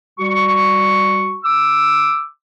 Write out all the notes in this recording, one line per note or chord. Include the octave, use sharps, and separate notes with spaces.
G3 F#4 C#6
D6 E6